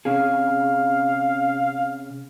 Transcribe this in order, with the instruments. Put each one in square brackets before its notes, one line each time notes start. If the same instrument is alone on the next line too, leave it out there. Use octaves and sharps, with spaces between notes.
[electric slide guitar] C3 C#4 G#4 [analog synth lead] F5